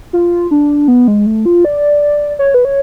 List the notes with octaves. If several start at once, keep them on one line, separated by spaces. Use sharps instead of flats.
F4
D4
B3
G#3
A3
F4
D5
C#5
B4
C#5